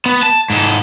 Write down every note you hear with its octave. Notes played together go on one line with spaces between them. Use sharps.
B3
A5
G#2 A4